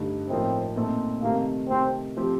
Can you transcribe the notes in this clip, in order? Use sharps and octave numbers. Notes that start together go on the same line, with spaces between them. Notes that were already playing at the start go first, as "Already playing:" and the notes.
Already playing: G2 D3 A3 D#4
A2 F3 A#3 C4 D#4
A#2 A3 C4 D#4
C3 D#3 A3 A#3
C3 D#3 A3 C4
F3 A3 C4 G4